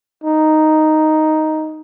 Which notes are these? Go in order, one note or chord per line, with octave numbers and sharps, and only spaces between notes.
D#4